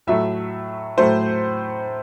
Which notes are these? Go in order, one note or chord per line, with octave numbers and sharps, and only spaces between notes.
A2 F#3 A3 E5
A2 F#3 A3 C5